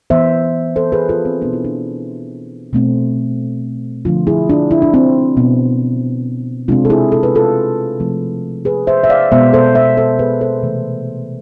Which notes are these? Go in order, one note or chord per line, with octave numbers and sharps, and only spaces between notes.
E3 B3 C5 E5
A4 C5
G#4 B4
F4 A4
C4
B2 B3 D4
E4
D4
B2 A3 C4
D3 F3 A3 D4 F4
E4 G#4
D4 F4
E4
D4
C4 E4
B2 B3
C3 G#3 C4 D4 F4
A4
E4 G#4
A4
B4
F4 A4
C3 F3 A3 C4
G#4 B4
C5 E5
E5
D5 F5
B2 G#3 B3 C5 E5
A4 C5
C5 E5
A4 C5
G#4 B4
A4 C5
C3 E3 A3